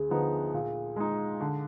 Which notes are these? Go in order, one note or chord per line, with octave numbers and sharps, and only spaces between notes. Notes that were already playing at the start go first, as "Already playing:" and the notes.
Already playing: D2 G#4
D3 F3 B3 D#4
A#2
G#3 D#4
D3